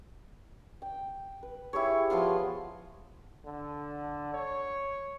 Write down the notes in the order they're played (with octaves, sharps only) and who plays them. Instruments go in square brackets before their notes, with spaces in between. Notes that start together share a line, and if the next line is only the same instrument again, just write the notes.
[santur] G5
B4
E4 G4 G#4 C#5
F3 B3 F4 C6
[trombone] D3
C#5